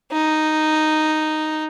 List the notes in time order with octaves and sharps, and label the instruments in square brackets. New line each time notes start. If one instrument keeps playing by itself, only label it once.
[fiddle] D#4